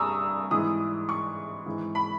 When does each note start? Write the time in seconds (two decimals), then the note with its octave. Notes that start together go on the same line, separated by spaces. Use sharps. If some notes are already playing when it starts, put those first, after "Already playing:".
Already playing: G2 G#5 A#5 C#6 D#6 E6
0.51 G#2 E3 D#6
1.09 C#6
1.66 G#2 E3
1.95 B5